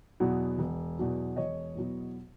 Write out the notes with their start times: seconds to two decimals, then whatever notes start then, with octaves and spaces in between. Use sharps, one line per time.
0.20 E2 B2 F#3 B3
0.58 E1
0.98 E2 B2 F#3 B3
1.36 E1 C#5 D#5
1.75 E2 B2 F#3 B3